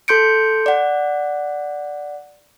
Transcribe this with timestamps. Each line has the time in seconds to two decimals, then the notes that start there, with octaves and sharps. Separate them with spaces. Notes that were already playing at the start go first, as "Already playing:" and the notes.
0.08 A4 C6 G6 C#7 D7
0.66 D5 F#5